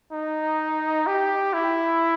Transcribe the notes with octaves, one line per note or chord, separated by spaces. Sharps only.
D#4
G4
E4